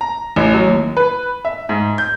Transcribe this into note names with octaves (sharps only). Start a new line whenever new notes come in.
A#5
A1
F#3
D#2
B4
E5
G#2
G6